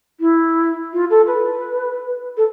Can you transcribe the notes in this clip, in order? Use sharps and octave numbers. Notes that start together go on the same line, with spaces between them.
E4
F4
A4
B4
A4